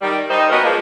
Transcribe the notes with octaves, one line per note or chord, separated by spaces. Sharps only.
D#3 G3
G3 D#4 C5
F#3 B3 C#4 F#4 A#4 D#5
F3 G#3 A#3